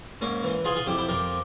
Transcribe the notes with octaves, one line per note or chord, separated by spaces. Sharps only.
G#2 A#3 C#4
E3
F3 F4 G#4
F4 G#4
F2 E4 G4
E4 G4
F3 G4 A#4